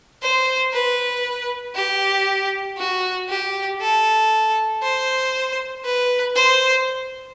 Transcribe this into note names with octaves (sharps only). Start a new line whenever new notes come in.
C5
B4
G4
F#4
G4
A4
C5
B4
C5